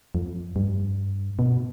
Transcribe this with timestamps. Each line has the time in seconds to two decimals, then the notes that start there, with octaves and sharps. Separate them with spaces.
0.15 F2
0.56 G2
1.39 B2